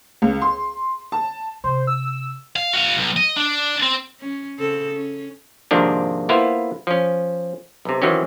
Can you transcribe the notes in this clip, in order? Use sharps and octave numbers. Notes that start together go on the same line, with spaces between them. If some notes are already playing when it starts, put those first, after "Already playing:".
C#2
C6
A5
C3 C5
E6
F5
F#4 F5
B1
D#5
D4
C4
C#4
C#3 C4 A4
C#4
G#2 C3 D#3 F3 A#3 D4
A#3 B3 E4 F4 C5 F5
F3 C#4
B1 C3
D#3 E3 F#3 C4 C#4